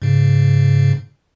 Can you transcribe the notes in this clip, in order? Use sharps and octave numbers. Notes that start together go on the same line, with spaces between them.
G#2 C#3